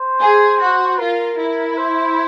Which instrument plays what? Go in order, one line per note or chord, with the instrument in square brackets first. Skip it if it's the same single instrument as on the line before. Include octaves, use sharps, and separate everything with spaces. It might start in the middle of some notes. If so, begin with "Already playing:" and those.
Already playing: [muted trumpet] C5
[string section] G#4
F#4
[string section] F4 [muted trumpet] A#4
[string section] E4
[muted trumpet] C5